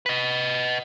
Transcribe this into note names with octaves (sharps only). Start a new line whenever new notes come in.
B4 D#5